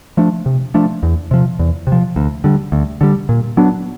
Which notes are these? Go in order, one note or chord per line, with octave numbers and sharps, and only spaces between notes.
F3 A3 D4
C3
F3 A3 D4
E2
C3 F3
E2
C3
F3
D2
D3 G3
D2
D3 G3
A#2
F#3 B3 D4